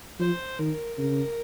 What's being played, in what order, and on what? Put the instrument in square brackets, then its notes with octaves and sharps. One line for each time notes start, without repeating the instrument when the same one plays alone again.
[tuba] F3 [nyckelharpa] C5
[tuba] D#3 [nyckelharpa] A#4
[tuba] C#3 [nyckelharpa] A#4